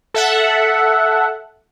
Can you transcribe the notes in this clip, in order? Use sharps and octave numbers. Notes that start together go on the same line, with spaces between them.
A4 E5 F#5